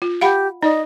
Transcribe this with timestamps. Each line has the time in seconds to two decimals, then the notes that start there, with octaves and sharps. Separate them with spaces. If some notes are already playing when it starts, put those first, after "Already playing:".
0.02 F4
0.21 G4 F5 F#5 B5
0.63 D#4 D5 D#5